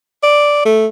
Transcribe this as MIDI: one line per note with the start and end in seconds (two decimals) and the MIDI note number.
0.23 0.63 74
0.65 0.86 57